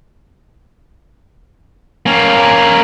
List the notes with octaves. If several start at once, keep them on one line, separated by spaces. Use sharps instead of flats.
A#3 C#4